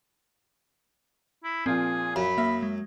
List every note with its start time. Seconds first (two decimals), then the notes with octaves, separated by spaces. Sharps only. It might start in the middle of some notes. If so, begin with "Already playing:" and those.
1.44 E4
1.66 A#2 F3 C4 F4 G#4
2.16 F#2 F5 B5
2.38 A#3 E5
2.63 G#3